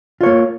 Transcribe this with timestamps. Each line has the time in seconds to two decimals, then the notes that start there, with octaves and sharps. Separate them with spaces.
0.21 F4
0.23 C#5
0.26 A#3